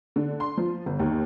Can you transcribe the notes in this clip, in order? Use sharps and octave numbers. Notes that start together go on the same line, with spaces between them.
D3
C6
F3
G1
D#2